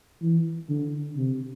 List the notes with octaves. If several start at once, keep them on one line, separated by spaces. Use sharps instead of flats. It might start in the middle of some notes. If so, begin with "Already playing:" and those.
E3
D3
C3